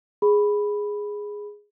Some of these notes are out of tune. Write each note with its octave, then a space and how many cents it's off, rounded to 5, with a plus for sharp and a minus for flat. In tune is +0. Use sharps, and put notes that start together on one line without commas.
G#4 +0 B5 +0